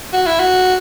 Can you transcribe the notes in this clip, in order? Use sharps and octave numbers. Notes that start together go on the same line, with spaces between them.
F#4
E4
F#4